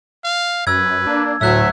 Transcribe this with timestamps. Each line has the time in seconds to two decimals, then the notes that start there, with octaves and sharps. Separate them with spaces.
0.24 F5
0.67 F#2 B4 E6 G#6
1.07 A#3 D4
1.41 D2 A2 F#3 A3 E5 E6 F#6 G#6